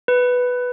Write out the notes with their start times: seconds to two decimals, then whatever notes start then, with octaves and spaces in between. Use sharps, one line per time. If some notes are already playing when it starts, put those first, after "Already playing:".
0.08 B4